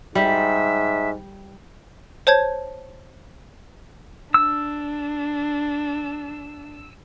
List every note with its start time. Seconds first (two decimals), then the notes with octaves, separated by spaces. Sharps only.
0.15 G#2 G3 E5
2.27 C5 C#5 A5 G6 G#6
4.34 D4 E6